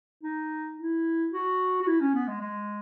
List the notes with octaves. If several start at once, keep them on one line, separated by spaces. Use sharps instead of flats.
D#4
E4
F#4
F#4
E4
C#4
B3
G#3
G#3